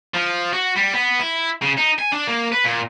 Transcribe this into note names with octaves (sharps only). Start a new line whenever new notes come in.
F3
F#4
G3
B3
E4
C#3
D#4
G#5
D4
A#3
B4
A#2